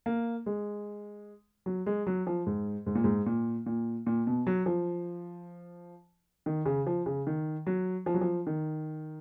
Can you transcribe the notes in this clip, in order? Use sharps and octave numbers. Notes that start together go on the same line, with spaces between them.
A#3
G#3
F#3
G#3
F#3
F3
G#2
G#2
A#2
G#2
A#2
A#2
A#2
B2
F#3
F3
D#3
C#3
F3
C#3
D#3
F#3
F3
F#3
F3
D#3